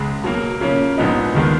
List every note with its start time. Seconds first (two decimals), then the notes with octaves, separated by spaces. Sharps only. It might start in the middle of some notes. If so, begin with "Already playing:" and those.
Already playing: C#2 C#3 G#3
0.24 B2 F#3 A#3
0.60 C#3 F3 A#3 C#4
0.97 A#1 G#2 F3 B3 D#4
1.35 D#2 D#3 G#3 B3